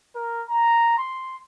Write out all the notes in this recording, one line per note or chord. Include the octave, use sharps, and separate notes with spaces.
A#4
A#5
C6